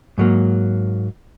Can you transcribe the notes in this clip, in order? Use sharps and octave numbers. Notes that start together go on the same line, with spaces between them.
G#2 F#3 A#3